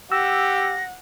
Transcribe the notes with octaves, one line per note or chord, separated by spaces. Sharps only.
G4 F#5 E6 A#6